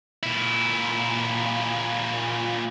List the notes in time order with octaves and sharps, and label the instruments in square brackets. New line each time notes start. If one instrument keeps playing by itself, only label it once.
[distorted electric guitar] A#2 E4